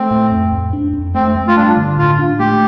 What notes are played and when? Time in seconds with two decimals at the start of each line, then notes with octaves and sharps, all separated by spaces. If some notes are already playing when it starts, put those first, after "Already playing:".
Already playing: A3 C4
0.11 A2
0.31 F2
0.52 F2
0.73 D4
0.93 F2
1.15 A3 C4
1.35 A3
1.47 F4
1.56 G2 D4
1.77 D3
1.98 A2 F4
2.19 D4
2.39 A3 G4